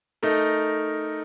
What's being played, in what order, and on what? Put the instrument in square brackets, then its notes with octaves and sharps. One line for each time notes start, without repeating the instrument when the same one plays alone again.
[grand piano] A3 D#4 A#4